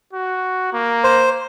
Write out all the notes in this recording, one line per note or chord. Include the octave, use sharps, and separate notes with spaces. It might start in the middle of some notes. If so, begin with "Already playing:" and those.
F#4
A#3
C5